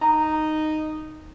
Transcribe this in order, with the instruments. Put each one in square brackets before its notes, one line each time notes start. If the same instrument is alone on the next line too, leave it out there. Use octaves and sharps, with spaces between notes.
[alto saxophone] D#4 [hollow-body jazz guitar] A#5